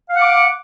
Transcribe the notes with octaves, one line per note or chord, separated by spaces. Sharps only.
F5 F#5 D6